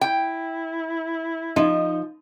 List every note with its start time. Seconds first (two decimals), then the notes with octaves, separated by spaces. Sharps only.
0.01 E4 G5
1.56 F3 D#4